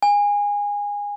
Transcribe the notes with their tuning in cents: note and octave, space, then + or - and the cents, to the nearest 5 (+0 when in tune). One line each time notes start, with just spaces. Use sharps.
G#5 -20